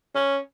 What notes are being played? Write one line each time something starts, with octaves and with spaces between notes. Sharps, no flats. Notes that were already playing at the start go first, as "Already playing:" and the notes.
C#4